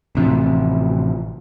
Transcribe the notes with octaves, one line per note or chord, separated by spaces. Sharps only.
A1 C3 E3 F3